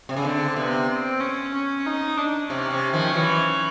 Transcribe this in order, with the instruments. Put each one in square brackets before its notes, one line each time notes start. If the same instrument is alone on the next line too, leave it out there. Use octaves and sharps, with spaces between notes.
[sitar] C3
C#3
[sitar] D3 [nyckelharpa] C4
[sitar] C3 [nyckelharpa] B3
[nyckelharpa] C4
C#4
C#4
D#4
D4
[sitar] C3 [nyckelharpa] C#4
[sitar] C3
D#3 F3
E3 F#3